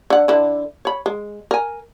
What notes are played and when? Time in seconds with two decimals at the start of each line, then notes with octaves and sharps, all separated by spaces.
0.10 D3 F#5
0.28 D3 E4
0.85 C#5 B5
1.06 G#3
1.51 A#4 G#5